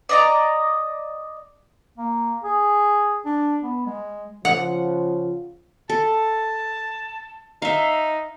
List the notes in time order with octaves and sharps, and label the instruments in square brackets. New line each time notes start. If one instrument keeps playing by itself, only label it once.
[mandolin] D5 D#5 A#5
[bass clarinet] A#3
G#4
D4
B3
G#3
[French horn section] C#3 F3 F4 [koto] F#5
[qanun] A4 [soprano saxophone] A5
[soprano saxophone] D#4 [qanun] E5 F5